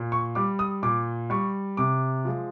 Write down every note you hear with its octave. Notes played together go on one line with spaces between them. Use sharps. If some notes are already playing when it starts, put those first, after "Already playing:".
Already playing: A#2
C#6
G3 D6
D#6
A#2 D6
G3 C#6
C3 D6
F3 G#3